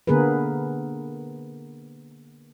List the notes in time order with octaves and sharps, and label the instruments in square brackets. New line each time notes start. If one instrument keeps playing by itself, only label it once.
[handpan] D3 A#3 B3 G#4 A#4 B4